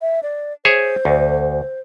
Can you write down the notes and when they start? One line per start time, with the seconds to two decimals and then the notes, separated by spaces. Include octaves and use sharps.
0.02 E5
0.23 D5
0.65 G#4 C5 C#5 E5
1.05 D2